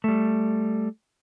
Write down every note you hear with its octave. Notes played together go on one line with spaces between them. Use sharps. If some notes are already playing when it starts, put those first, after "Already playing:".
G3 A3